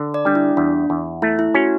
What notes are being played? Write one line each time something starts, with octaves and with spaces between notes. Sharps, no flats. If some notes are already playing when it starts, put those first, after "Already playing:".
Already playing: D3
D5
G3 D4
E4
E2 D4
E2
A3 E4
E4
C#4 F#4